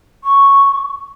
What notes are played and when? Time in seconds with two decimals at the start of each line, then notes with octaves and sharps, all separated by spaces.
0.24 C#6